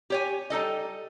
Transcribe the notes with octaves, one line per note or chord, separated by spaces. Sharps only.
G4 C#5 G#5
G3 D#4 A4 D#5